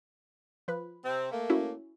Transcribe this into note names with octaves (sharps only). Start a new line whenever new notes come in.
F3 B4
C3 C4
A3 A#3
C#4 E4 F#4